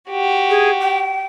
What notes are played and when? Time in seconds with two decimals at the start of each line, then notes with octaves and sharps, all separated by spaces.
0.10 F#4 G4
0.50 G#4
0.80 G5